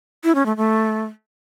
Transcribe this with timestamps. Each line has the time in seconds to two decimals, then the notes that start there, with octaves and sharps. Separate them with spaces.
0.24 E4
0.35 C#4
0.46 A3
0.57 A3